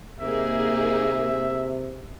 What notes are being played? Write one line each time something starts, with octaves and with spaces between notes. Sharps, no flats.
C3 A#3 D#4 G#4 E5